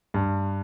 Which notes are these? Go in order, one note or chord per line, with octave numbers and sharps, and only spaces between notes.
G2